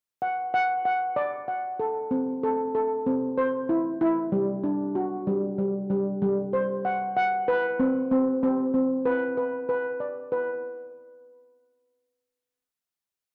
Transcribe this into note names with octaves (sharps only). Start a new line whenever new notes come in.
F#5
F#5
F#5
D5
F#5
A4
C4
A4
A4
C4
C5
E4
E4
G3
D4
F#4
G3
G3
G3
G3
C5
F#5
F#5
B4
C4
C4
C4
C4
B4
B4
B4
D5
B4